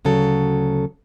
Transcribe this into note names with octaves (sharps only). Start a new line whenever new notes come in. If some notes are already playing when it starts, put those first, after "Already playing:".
D2 C#3 F#3 A4